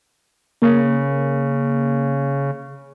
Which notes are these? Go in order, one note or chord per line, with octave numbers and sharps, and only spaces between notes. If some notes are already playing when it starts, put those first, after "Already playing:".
C#3 A#3